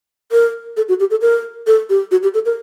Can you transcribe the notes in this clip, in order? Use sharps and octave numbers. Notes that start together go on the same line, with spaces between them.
A#4
A4
F#4
G4
A4
A#4
A4
G4
F#4
G4
A4
A#4